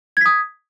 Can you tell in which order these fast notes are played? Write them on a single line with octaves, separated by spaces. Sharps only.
G#6 B6 D#6